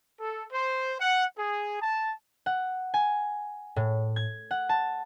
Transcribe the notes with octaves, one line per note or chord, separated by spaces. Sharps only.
A4
C5
F#5
G#4
A5
F#5
G#5
A2
G#6
F#5
A5